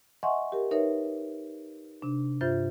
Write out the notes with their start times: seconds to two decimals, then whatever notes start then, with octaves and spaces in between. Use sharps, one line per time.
0.23 D#5 E5 F#5 G#5 C6 C#6
0.52 G4 A#4
0.71 D#4 A#4 B4 C#5 E5
2.02 C3 D4
2.41 G2 F4 C5 E5 G6 A6